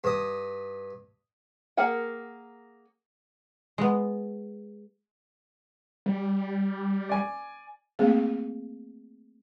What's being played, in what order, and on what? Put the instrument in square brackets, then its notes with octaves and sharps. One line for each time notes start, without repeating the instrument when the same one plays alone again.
[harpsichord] G2 D#6
[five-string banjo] A#3 G#4 A#4 F#5 G5
[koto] G#3 B3
[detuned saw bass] G3
[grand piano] D5 G#5
[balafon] A3 A#3 C4 G#4 F5